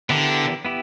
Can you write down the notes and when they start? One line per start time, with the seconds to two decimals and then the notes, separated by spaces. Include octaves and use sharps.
0.10 D3 B3 E4 G4 A#4
0.65 B3 E4 G4